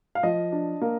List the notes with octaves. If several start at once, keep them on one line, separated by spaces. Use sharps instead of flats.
F5
F3 D#5
D4
A#3